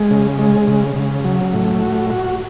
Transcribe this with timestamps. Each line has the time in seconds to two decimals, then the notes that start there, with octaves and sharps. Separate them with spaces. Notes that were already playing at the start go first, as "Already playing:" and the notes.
Already playing: G#3
0.11 C#3
0.39 G#3
0.67 C#3
0.96 C#3
1.24 F#3
1.53 A2
1.82 F#4
2.10 F#4